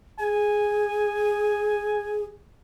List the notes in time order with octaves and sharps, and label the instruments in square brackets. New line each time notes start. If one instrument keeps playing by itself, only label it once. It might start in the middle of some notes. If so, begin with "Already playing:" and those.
[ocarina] G#4 [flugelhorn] G#5